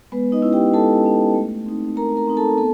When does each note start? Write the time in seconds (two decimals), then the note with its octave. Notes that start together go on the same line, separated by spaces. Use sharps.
0.12 G#3 B3 B4
0.32 D#4 D#5
0.42 C#4 E4
0.53 G4 G5
0.73 G#3 A4 A5
1.04 C#4 E4
1.34 A3
1.66 C4 D#4
1.96 A3 A#4 A#5
2.17 A#4 A#5
2.27 C4 D#4
2.37 A4 A5
2.58 B3 A4 A5